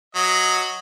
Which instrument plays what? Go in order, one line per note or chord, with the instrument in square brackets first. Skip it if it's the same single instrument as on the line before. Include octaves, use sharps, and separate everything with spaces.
[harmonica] F#3 D#5